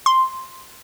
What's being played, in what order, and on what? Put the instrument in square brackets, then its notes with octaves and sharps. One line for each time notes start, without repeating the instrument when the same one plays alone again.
[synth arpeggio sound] C6